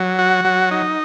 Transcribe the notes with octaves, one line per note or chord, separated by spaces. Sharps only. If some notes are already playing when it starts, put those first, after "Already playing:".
Already playing: F#3
F#4
F#3
D#4